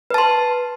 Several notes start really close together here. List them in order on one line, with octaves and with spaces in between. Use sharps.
B4 A5 C6